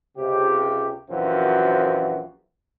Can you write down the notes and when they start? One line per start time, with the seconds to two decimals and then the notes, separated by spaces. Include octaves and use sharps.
0.16 C#2 C3 G4
1.10 A#1 F#2 E3 F3 C4 F#4